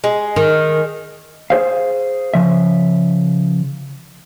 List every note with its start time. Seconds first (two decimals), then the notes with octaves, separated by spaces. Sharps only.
0.04 G#3
0.36 D#3
1.50 G#4 C5 F5
2.34 C#3 F3 E5